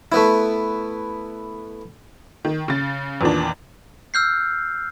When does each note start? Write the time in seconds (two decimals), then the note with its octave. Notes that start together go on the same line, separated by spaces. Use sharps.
0.12 A3 B3 E4
2.45 D#3
2.68 C#3 A6
3.21 E2 A#2 D#3 D4
4.14 E6 F6 G6 C7